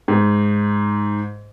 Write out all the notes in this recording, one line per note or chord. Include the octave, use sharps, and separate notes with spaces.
G#2